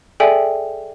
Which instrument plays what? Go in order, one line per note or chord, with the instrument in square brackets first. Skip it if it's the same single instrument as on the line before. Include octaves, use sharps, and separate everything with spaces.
[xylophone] G#4 A4 D5 E5 G5 G#5